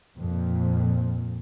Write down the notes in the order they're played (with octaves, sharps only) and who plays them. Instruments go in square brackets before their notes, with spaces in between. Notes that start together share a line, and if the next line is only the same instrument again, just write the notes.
[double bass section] F2 A#2